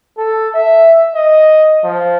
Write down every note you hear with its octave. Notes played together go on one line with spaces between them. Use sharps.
A4
E5
D#5
F3